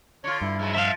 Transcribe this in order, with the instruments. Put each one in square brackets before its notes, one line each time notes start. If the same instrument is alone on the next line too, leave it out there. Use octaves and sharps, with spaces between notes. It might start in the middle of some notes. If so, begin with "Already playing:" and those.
[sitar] D3 F4 [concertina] C#5
[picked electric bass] G2 [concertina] E4
[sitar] G#2 F3 F#3
[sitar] F3 [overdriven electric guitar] E5 F5